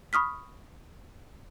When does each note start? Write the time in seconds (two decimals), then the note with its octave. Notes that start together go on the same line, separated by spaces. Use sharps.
0.13 B5 C#6 D#6 F6 B6